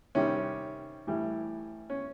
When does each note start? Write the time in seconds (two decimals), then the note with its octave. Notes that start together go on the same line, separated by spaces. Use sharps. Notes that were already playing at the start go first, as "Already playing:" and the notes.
0.15 C3 D#3 G3 C#4
1.07 A2 E3 G3
1.90 C#4